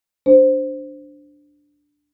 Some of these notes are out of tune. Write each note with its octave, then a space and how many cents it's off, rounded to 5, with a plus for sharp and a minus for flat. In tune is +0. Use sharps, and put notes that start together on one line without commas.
D4 +0 C5 +0